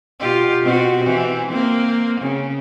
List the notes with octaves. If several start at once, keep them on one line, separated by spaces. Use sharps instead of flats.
B2 F4 G4
B2 C4 F#4
E3 C4
A#3 C4
C#3